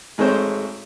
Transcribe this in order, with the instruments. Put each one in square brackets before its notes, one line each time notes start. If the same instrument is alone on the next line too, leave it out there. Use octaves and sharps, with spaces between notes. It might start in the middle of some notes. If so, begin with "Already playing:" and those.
[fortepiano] G#1 G#3 A3 C4 C5 C#5